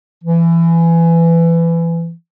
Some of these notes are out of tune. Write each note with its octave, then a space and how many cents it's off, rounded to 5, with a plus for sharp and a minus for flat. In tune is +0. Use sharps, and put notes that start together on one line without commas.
E3 +20